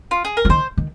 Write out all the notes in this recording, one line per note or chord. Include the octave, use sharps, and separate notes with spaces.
F4
G#4
A#4
F3
D#3 C5
D#3